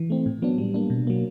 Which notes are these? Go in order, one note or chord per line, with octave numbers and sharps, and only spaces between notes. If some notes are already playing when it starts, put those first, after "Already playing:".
Already playing: E3
A3 C4
A2
F#3 B3 D4
G3
A#3 D4
B2
F#3 A#3